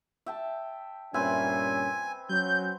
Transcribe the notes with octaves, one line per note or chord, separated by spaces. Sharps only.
E5 G5 A5
G2 A#2 C4 C#4 B4 E5 G#5
F#3 C#4 G6